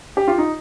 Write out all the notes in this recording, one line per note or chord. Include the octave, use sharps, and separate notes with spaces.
G4
F4
D#4